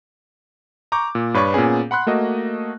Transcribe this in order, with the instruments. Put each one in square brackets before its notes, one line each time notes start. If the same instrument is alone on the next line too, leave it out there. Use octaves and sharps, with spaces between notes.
[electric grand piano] A#5 C#6 D6 G6
A#2
G2 B4 C#5 D5 C#6
A#2 B3 C#4 G#4
F#5 B5 C6 F#6
A3 A#3 F#4 D#5